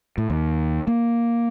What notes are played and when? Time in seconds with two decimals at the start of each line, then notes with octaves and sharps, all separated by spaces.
0.18 A2
0.30 D#2
0.87 A#3